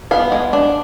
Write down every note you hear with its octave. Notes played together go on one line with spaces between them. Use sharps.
B3 F5
G#3
D4